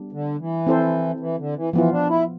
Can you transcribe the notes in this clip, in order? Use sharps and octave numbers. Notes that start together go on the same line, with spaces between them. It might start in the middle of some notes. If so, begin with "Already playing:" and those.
Already playing: G3 B3 D4
D3
E3
C4 E4 A4 C5
E3
D3
E3
E3 F3 B3 F4
D4
E4